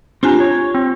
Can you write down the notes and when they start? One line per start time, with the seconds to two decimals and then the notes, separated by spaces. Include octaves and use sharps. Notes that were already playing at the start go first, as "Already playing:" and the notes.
0.23 C4 D4 F4 G4 G#5 A#5
0.40 C#5
0.74 C4